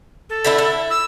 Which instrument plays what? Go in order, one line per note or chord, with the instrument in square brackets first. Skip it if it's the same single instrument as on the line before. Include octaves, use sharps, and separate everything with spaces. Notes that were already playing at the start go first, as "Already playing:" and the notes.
[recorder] A4
[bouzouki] D3 A3 E4
E4
[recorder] E6